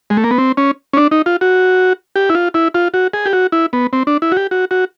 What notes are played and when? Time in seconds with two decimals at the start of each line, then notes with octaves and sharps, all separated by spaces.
0.10 G#3
0.17 A3
0.24 A#3
0.31 B3
0.38 C4
0.57 C#4
0.93 C#4
0.97 D4
1.12 D#4
1.26 F4
1.41 F#4
2.16 G4
2.29 E4
2.35 F4
2.54 E4
2.74 F4
2.94 F#4
3.13 G#4
3.26 G4
3.33 F#4
3.52 E4
3.73 B3
3.93 C4
4.07 D4
4.22 E4
4.32 F#4
4.37 G4
4.51 F#4
4.71 F#4